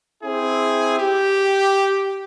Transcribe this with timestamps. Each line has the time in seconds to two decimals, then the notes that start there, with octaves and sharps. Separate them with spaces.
0.23 C4 E4 G#4
0.99 G4